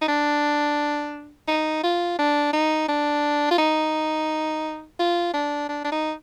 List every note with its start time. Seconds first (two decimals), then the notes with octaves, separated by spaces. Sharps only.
0.02 D#4
0.08 D4
1.48 D#4
1.84 F4
2.19 D4
2.53 D#4
2.89 D4
3.51 F4
3.58 D#4
4.99 F4
5.34 D4
5.69 D4
5.85 D4
5.92 D#4